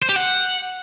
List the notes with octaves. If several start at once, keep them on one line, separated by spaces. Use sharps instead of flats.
C5
G4
F#5